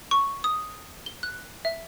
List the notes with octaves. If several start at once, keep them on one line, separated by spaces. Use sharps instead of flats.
C#6
D#6
G7
F#6
E5